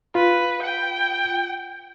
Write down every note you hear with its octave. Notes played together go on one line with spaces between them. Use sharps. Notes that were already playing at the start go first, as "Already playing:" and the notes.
F4 B4
G5